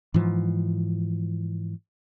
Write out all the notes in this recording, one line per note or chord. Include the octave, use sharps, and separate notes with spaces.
G#2 E3 F3